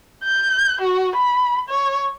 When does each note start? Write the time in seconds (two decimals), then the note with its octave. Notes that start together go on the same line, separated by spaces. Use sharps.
0.24 G6
0.81 F#4
1.16 B5
1.69 C#5